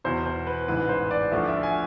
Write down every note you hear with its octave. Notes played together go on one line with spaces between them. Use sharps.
E2 B2 C5
C5
B4
A1 G#2 E3 B4
C5
D5
D2 D3 F3 E5
E5
G#5